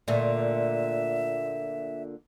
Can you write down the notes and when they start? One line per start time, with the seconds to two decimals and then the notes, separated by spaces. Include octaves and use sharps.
0.08 A#2 D3 A3 E5